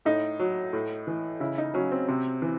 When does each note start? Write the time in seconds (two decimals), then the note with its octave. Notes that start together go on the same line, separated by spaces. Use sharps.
0.05 A2 D#4
0.39 F#3
0.73 A2
1.07 E3
1.40 C#3 E4
1.58 D#4
1.74 F#3 C#4
1.92 C4
2.09 C3
2.42 E3